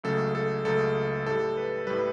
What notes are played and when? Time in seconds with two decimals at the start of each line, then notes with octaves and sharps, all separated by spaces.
0.04 C#2 C#3 F#3 A3 A4
0.35 A4
0.65 C#2 C#3 F#3 A3 A4
1.26 A2 G3 A4
1.57 B4
1.87 A2 G3 B4